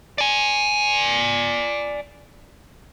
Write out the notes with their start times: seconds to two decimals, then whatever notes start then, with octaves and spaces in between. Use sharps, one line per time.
0.18 D5 G#5